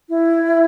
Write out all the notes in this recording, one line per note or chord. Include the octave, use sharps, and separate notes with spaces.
E4